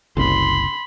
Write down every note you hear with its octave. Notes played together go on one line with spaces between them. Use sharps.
F#1 C2 B5 C6